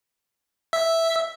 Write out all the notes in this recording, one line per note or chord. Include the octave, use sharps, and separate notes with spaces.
E5